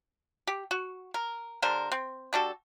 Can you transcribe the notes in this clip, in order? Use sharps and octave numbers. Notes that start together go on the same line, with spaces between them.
G4
F#4
A#4
D3 G3 A#4 C5
C4
G3 D4 F#4 A4